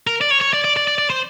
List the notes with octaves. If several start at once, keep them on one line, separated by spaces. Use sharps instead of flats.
A#4
D5
C#5
C#5
D5
D5
D5
D5
D5
C5